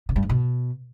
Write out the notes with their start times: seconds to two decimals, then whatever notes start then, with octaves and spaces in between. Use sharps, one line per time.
0.09 C#3
0.16 G2
0.23 G#2
0.29 B2